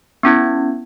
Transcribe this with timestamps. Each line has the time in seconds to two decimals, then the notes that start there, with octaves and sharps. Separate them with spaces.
0.23 B3 C#4 E4 G#6